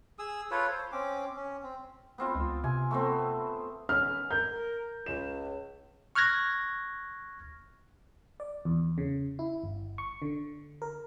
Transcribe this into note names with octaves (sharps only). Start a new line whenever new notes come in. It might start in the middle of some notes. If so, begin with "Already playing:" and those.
G#4 D#6 E6
F4 A4 B4 C#5
C5
C4 C#4 D6
C#4
C4
B3 C4 F4
C#2
C3 G#5
A3 B3 C4
D#3 B3 C#4 F6
A#4 G6
C#2 E7
C#6 F6 F#6 G#6 A#6
D5
E2
C#3
E4
G1
C#6
D3
A#4